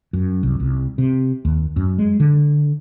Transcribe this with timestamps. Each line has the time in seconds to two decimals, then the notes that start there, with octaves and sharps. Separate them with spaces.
0.13 F#2
0.43 C2
0.60 C2
0.98 C3
1.45 D#2
1.76 F#2
1.98 G#3
2.20 D3